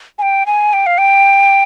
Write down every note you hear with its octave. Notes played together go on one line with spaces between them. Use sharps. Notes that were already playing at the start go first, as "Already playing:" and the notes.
G#5
G5
G#5
G5
F5
G5